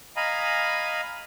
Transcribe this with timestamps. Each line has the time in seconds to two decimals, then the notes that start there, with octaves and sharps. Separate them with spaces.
0.16 D#5 F5 G#5 A#5 B5